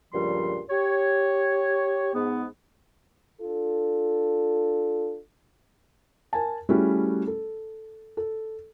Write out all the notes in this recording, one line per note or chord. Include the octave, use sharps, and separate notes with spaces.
C#2 G2 A#2 F3 G3 C6
G4 C#5
G#2 B3
D4 F4 A4
A#4 G#5 A5
G3 A3 C#4 E4 F#4 G#4
A4
A4